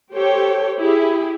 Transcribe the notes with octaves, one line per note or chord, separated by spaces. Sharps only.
G4 A4 C5 C#5 G5
E4 G4 G#4